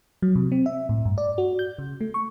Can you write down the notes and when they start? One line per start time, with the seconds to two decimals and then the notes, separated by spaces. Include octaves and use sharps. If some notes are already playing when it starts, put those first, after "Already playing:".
0.22 F#3
0.35 C3
0.52 C4
0.66 E5
0.89 A2
1.05 G2
1.18 D5
1.38 F#4
1.59 G6
1.79 C#3
2.01 A3
2.14 C#6